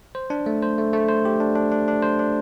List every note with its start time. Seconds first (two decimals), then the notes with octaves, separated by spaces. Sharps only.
0.15 C5
0.30 D4
0.46 A3
0.63 C5
0.78 A3
0.93 A3
1.09 C5
1.25 G4
1.40 D4
1.55 D4
1.72 D4
1.88 D4
2.03 C5
2.19 D4